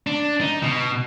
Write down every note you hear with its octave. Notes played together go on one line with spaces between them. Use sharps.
D4
D#4
B2